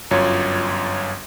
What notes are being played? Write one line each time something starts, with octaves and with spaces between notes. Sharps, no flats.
G1 F#2 F4 C#5